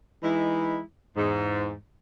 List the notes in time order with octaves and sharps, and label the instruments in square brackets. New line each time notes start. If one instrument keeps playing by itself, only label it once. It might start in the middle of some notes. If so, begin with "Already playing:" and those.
[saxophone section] E3 G#3 D#4 E4
E2 G#2